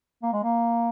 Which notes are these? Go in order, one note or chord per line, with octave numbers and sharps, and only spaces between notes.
A#3
G#3
A#3